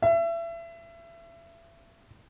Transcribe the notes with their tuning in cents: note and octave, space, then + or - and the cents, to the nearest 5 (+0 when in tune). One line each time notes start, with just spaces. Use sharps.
E5 +30